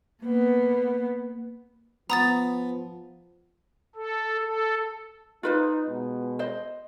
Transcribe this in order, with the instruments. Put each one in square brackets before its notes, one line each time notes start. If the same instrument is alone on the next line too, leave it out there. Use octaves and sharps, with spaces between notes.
[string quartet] A#3 B3
[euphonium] F3 [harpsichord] B3 [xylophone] A#5 D#6 A6
[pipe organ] A4
A4
[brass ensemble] D#4 [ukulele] F4 B4 C5
[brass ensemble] B2 G#3 B3
[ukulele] C5 D#5